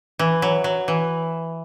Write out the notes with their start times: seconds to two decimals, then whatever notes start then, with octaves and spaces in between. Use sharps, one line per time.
0.19 E3
0.42 F#3
0.64 F#3
0.88 E3